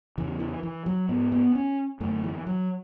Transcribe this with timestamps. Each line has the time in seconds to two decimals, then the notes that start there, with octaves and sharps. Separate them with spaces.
0.18 E2 C#3 E3
0.40 E3
0.63 E3
0.86 F#3
1.09 G#2 B3
1.32 B3
1.55 C#4
2.00 F#2 D3 A3
2.24 E3
2.47 F#3